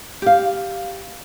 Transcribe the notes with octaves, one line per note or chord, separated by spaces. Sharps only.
G4 F5